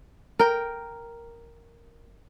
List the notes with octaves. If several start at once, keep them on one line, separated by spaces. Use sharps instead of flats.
A#4 G5